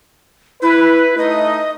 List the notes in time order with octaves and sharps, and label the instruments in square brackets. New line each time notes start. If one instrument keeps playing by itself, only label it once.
[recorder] E4 [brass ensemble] B4
[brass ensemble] A3 D#4 [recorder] D#5